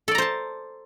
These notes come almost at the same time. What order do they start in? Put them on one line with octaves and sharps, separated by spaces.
A4 D5 A#5 C5 A5